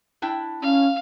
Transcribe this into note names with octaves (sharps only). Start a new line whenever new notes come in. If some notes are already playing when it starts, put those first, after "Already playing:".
D4 E4 G5
C#4 F5